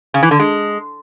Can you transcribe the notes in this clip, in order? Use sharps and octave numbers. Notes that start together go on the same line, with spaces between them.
C#3
E3
D3
G#3